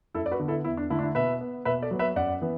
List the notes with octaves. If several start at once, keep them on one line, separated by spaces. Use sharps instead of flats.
F#2 E4 A4
D5
F#4 B4
D3 B3
E4 A4
E2 E4
D4
D3 A3 E4
D4
E4
B2 B4 E5
B3
B2 B4 E5
A4 D5
F#3 B3
B4 E5
F#2 D5 F#5
E3 B3